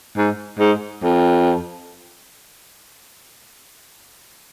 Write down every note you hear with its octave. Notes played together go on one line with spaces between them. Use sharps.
G#2
G#2
F2